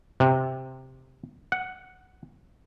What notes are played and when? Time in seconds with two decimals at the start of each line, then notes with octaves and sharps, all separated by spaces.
0.20 C3
1.52 F#5